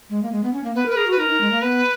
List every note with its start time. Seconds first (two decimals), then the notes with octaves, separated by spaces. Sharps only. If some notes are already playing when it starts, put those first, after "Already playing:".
0.10 G#3
0.23 A#3
0.32 G#3
0.44 B3
0.53 C#4
0.64 A#3
0.75 B3 B4
0.86 A#4 B4
0.96 G#4 A#4
1.07 F#4 B4
1.19 D#4 A#4
1.29 D#4
1.41 G#3
1.51 A#3
1.62 B3 B4